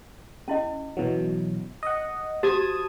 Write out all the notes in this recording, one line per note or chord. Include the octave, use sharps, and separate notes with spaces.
C#4 E4 D#5
B2 E3 F#3
D#5 F#5
F#4 G4 C5 A5 D#6 G#6